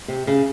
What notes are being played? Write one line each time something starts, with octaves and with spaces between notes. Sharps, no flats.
C3
C#3